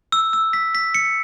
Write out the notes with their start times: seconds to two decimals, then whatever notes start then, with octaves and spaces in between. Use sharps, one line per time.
0.12 E6
0.33 E6
0.53 B6
0.75 B6
0.95 C#7